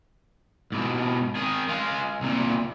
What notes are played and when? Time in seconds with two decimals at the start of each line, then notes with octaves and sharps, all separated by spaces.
0.72 G#2 B2
1.36 D#3 G#4
1.68 G#3 F4
2.21 C2 A#2